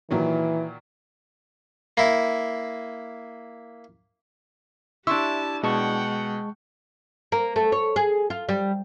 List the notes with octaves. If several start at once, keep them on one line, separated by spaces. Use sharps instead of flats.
A#2 D#3 E3 F#3
A#3 E4
D4 E4 G4 A5 C6 C#6 E6
B2 G#3 F#5 G5 A5 C#6
A#3
A3
C#5
G#4
F4
G3